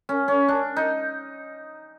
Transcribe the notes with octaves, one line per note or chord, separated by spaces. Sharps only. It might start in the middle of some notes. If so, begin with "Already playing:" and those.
C#4
C#4
D4
D#4